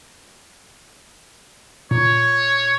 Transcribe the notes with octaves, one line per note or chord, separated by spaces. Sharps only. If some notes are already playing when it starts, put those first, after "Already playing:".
A#2 C#5